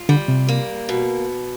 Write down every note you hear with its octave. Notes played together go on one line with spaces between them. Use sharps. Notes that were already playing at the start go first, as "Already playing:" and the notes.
Already playing: F4
D3 G3
C3
A#3
B2